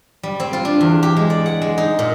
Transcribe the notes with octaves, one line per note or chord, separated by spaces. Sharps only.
G3
C4
F4
D4
E2
G4
G#3
D5
F#5
G#3
D#4
A#2